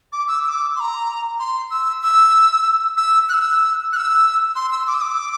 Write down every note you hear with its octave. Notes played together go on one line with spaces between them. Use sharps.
D6
E6
E6
D6
C6
A#5
C6
E6
E6
E6
F#6
E6
F#6
E6
C6
E6
D6
E6
D6